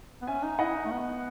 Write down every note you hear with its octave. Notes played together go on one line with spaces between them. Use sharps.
B3
C#4 E5 G#5
D#4
E4 D#5 F#5
D#4
A3
B3